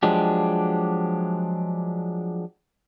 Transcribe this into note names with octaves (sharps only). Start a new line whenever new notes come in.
F3 F#3 G#3 D4 G4